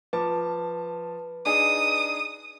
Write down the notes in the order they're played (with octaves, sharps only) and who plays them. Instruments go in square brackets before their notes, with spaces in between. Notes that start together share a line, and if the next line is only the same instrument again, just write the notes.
[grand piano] F3 A5 D6 [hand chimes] B4
[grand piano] D4 D#4 G#4 [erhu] D#6